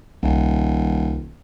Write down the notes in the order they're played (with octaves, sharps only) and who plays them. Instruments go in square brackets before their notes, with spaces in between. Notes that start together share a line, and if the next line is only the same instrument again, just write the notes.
[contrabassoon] D#1 [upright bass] C2 D#3